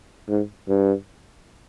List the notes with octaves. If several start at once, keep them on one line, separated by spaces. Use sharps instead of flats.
G#2
G2